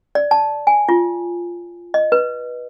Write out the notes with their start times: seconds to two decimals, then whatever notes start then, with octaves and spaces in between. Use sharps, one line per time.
0.15 D5
0.31 A5
0.67 G#5
0.89 F4
1.94 D#5
2.12 B4